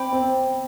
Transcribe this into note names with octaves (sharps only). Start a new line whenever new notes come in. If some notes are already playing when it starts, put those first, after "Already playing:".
Already playing: C4 D5 G5 B5
C4